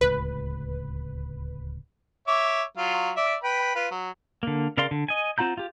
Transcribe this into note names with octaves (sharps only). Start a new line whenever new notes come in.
D1 C#2 B4
C#5 E5 D6
F#3 F4
D5 E5
B4 G5 B5
F4 B4
F#3
D3 A#3
C#3 A#4 D5 F5 C6
D3
D#5 G#5
C4 F4 F#5 A#5 G6
F4 G4